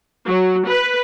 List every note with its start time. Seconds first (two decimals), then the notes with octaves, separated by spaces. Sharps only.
0.25 F#3
0.65 B4